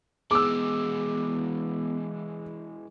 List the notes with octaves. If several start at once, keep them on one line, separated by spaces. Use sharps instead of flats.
E3 G#3 B3 G#4 D6 E6